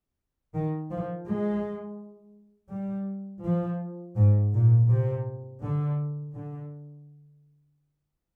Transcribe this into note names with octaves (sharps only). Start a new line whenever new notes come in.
D#3
F3
G#3
G3
F3
G#2
A#2
C3
D3
D3